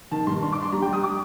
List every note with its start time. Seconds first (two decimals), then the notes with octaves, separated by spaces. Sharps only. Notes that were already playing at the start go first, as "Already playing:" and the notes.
0.11 D#3 A5
0.27 G2 C6
0.42 D4 C6
0.52 D6
0.58 D4 C6
0.72 G3 A#5
0.82 G5
0.88 G3 D#6
1.04 D6